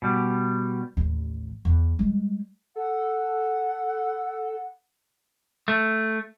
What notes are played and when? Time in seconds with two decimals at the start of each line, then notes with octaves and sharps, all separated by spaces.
0.02 B2 G3
0.97 A1 D#2
1.65 E2
1.99 G3 G#3
2.76 A4 F#5
5.68 A3